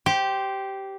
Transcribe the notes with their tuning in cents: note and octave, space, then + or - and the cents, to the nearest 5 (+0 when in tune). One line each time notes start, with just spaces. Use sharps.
G4 -10 C5 +0